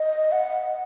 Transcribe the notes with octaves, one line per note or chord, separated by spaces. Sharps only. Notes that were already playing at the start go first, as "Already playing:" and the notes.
Already playing: D#5
F#5